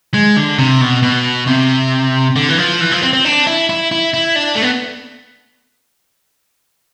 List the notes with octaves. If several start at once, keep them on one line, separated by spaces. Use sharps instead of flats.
G#3
D3
C3
B2
B2
C3
D3
E3
F3
E3
F3
C4
C4
D4
E4
E4
E4
E4
D4
A3
B3